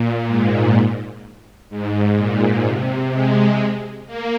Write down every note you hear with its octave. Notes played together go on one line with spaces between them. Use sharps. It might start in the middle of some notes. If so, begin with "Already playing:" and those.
Already playing: A#2
G#2
G#2
A#2
C3
G#3
A#3